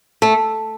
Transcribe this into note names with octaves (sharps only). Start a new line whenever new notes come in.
A3